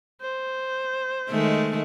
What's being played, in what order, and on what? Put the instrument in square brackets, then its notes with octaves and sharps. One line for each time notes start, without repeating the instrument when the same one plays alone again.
[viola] C5
[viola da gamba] D#3 G#3 A3